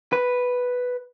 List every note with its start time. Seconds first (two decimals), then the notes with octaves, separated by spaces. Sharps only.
0.13 B4